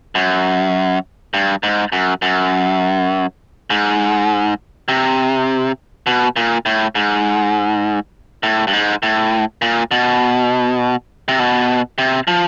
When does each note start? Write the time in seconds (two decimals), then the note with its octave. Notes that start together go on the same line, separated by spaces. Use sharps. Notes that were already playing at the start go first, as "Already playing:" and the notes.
0.15 F#2
1.34 G2
1.63 G#2
1.92 F#2
2.22 F#2
3.70 G#2
4.88 C3
6.07 B2
6.36 A#2
6.66 A2
6.95 G#2
8.43 A2
8.67 G2
8.73 G#2
9.03 A2
9.62 A#2
9.91 B2
11.28 C3
11.39 B2
11.98 C3
12.28 F3